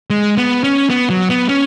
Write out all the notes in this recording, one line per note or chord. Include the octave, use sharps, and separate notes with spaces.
G#3
B3
C#4
B3
F#3
B3
C#4